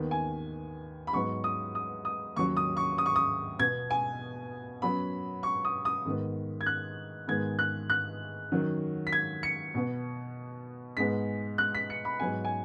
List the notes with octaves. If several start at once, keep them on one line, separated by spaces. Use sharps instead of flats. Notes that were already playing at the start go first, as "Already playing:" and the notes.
Already playing: D#2 D#3 B3
G#5
B5
G#2 F#3 B3 C#6
D#6
D#6
D#6
D#2 C#3 F#3 C#6
D#6
C#6
D#6
C#6
D#6
B2 B3 G#6
G#5
F#2 F#3 B3 B5
C#6
D#6
D#6
G#2 D#3 B3
G#6
F#6
G#2 D#3 G#3 B3 G#6
F#6
F#6
F#2 D#3 F#3
B6
G#6
C#7
B2 B3
G#2 G#3 B3 B6
F#6
B6
C#7
B5
G#2 F#3 B3 G#5
G#5